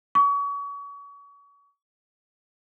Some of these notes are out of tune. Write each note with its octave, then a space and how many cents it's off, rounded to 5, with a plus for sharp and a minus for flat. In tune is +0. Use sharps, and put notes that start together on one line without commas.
C#6 +35